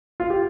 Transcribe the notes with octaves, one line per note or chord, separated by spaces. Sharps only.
F4
G4